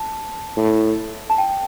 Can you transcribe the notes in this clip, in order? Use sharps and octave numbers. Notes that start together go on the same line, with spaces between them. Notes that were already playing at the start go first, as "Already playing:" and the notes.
Already playing: A5
A2
A5
G5